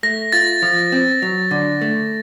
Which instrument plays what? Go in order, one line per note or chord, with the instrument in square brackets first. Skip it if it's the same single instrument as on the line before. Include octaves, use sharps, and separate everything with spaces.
[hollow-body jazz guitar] A3 [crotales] A#6
[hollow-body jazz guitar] F4 [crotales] A6
[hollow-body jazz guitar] F3
C4
F#3
D3
A3